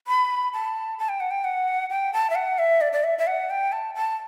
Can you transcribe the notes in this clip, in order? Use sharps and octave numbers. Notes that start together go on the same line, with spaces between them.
B5
A5
A5
G5
F#5
G5
F#5
G5
A5
E5
F#5
E5
D5
D5
E5
E5
F#5
G5
A5
A5